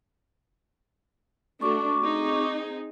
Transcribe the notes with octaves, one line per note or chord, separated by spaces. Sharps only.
A3 D4 F#4 C#6 D6
C4 D#4 G#4